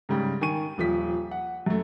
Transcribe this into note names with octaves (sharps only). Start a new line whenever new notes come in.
G#2 C#3 G3
D#3 G#5 C#6 D#7
D#1 F3 B6
F#5
F#2 A3